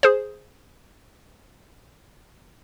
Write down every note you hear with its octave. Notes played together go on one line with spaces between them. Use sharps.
G#4 C5